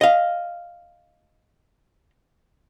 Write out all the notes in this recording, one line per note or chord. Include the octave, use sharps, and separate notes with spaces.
D#5 F5